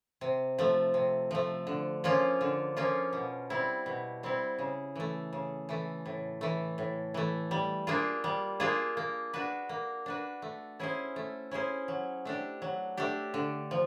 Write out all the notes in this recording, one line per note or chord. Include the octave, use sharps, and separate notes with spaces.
C3
F3 A3
C3
F3 A3
D3
F3 A#3 C#4 F4
D3
F3 A#3 C#4 F4
B2
G3 C4 E4
B2
G3 C4 E4
C#3
E3 A3
C#3
E3 A3
A2
E3 A3
A2
E3 A3
G3
A#3 D4 F4 G#4
G3
A#3 D4 F4 G#4
A#3
D4 F#4 B4
A#3
D4 F#4 B4
A3
C#4 E4 G#4 C5
A3
C#4 E4 G#4 C5
F#3
A3 D4 G4
F#3
A3 D4 G4
D3
F3